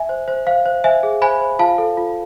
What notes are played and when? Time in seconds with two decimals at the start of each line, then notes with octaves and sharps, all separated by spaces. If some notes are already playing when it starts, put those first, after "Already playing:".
Already playing: E5 G#5
0.09 C5
0.28 C5
0.47 C5 F5
0.66 C5
0.84 C5 E5 G#5
1.03 G#4
1.22 C5 G#5 B5
1.41 C5
1.59 F4 F5 A5
1.78 A4
1.97 F4